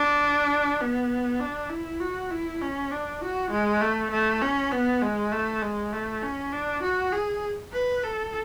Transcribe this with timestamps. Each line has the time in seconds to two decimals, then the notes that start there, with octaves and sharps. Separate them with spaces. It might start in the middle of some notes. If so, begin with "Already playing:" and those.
Already playing: D4
0.80 B3
1.40 D4
1.70 E4
2.00 F#4
2.31 E4
2.61 C#4
2.91 D4
3.22 F#4
3.51 G#3
3.81 A3
4.11 A3
4.41 C#4
4.71 B3
5.02 G#3
5.32 A3
5.62 G#3
5.93 A3
6.23 C#4
6.52 D4
6.83 F#4
7.13 G#4
7.73 B4
8.04 A4